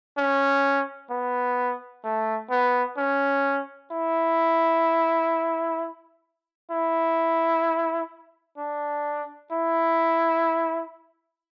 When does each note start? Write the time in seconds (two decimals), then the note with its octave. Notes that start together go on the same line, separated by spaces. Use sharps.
0.18 C#4
1.11 B3
2.04 A3
2.51 B3
2.97 C#4
3.92 E4
6.71 E4
8.58 D4
9.52 E4